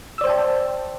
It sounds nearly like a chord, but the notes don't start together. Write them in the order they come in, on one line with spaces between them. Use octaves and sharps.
E6 D5 C5 G5 A5